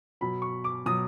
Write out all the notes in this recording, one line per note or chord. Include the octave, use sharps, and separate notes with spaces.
B2 F#3 B5
C#6
D6
B2 F#3 D#6